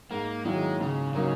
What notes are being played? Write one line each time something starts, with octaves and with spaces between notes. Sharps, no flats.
G#2 A#3
D#3 F#3 G#3 A#3 E4
G#2 C#3
C#3 F#3 A#3 D#4